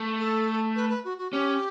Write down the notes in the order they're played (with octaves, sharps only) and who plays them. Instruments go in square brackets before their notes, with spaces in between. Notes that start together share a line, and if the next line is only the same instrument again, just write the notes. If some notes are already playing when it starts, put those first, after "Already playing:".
Already playing: [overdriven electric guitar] A3
[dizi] A4
B4
B4
F#4
F#4
[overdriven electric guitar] C#4 [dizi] G4